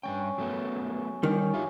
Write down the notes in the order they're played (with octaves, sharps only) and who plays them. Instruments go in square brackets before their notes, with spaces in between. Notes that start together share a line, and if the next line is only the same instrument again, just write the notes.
[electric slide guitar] G2 G#3 G5 [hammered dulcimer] C#4
[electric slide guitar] F#3 A3 B3
[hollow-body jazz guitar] D#3 [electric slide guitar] G3 [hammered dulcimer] C#4
[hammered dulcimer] F#2 [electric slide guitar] F4 G4 E5